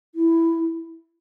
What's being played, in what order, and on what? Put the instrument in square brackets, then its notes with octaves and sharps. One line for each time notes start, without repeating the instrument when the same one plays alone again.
[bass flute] E4